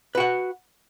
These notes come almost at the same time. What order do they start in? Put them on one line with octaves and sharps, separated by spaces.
B4 F#4 F#5